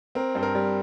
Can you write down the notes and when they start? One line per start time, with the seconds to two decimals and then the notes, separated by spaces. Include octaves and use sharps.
0.15 C4 A#4
0.35 G2 C5
0.43 A#4
0.55 G3